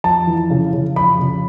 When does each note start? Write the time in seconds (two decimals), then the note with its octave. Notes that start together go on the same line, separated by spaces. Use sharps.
0.04 F2 A5
0.27 E3
0.50 C#3
0.73 C#3
0.96 F2 B5
1.19 C#3